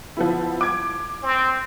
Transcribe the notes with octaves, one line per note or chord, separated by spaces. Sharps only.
F3 B3 E4
D6 G#6
C4